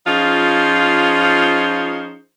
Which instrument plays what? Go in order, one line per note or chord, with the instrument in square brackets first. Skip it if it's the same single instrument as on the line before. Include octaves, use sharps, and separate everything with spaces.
[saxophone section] F3 C#4 D#4 F4 G#4 C5